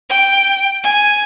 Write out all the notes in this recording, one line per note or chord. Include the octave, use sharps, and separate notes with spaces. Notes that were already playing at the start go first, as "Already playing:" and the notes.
G5
G#5